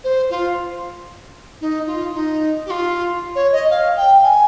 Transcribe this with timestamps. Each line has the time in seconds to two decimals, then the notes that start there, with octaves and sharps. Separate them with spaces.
0.04 C5
0.30 F4
1.60 D#4
1.86 F4
2.13 D#4
2.66 G4
2.70 F4
3.35 C#5
3.52 D#5
3.70 F5
3.96 G5
4.23 G#5